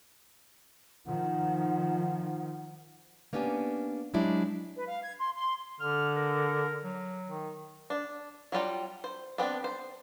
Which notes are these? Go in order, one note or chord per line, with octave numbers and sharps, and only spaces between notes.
D#3 F3 F#5
A#3 B3 C#4 D4 G4 G#5
F#3 G#3 D4 E4 G4
B4
F5
G#6
C6
C6
D3 F6
A#4
F#3
D#3
D4
F#3 G3 F4 G5
C5
B3 C4 D4
C5